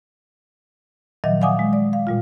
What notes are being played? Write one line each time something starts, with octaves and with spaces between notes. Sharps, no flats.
A#2 D#3 F3 F#3 D#5 E5
D5 F5 F#5 G#5 D6 D#6
G#3
D5
F5
A#2 G3 F4